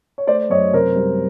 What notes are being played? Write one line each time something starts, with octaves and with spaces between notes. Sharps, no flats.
C#5
A3 C5 D5
F#2 C#5 D#5
C3 A#4 C5
G3